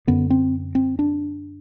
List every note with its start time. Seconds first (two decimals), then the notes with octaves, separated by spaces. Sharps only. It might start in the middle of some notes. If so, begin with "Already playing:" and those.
0.07 F#2 D3 B3
0.30 C4
0.75 C4
0.99 D4